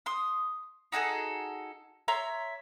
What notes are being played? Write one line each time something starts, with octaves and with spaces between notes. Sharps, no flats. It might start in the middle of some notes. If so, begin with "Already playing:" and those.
C6 D#6
D#4 F#4 G#4 A4
C#5 E5 A#5 C6